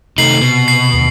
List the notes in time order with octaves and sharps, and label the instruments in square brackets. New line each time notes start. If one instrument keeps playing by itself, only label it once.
[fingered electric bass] C3 [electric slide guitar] D#3 A3 D#4 [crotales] C7 F#7
[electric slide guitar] B2
[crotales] C7
[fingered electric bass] D#2 D3